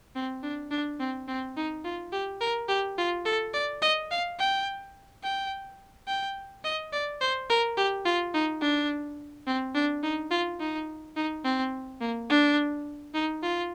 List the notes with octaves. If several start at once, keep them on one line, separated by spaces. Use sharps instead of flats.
C4
D4
D4
C4
C4
D#4
F4
G4
A#4
G4
F4
A4
D5
D#5
F5
G5
G5
G5
D#5
D5
C5
A#4
G4
F4
D#4
D4
C4
D4
D#4
F4
D#4
D#4
C4
A#3
D4
D#4
F4